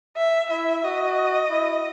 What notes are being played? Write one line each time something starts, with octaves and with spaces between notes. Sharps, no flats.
E5
E4 E5
F#4 D#5
E4